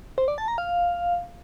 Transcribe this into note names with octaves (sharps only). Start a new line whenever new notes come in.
C5
D5
A5
A#5
F5